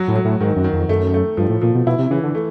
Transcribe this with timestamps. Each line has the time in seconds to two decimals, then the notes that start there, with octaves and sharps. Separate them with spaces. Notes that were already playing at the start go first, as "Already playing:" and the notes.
Already playing: F#3 F#4
0.08 A2
0.16 F#3
0.25 A2
0.40 G#2 D#3
0.56 F#2
0.64 D#3
0.73 F2
0.89 F#2 A3
1.14 A3
1.37 G2 F3
1.49 A2
1.62 A#2 F3
1.74 B2
1.86 B2 E4
1.99 C3
2.10 C#3 E3
2.23 D3
2.35 A3